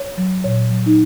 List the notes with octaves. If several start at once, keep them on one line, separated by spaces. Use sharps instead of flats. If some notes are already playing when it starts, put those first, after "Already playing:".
Already playing: C#5
F#3
A#2 C#5
F#3
D#4